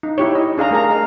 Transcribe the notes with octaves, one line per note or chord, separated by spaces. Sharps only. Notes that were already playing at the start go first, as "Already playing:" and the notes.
D#4
E4 G4 C#5
D#5
D4 G#4 F5 A#5
A3 A#4 F5 A#5
A#4 D#5 F5